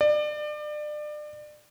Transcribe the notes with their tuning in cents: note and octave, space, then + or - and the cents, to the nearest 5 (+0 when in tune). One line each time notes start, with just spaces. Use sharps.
D5 +30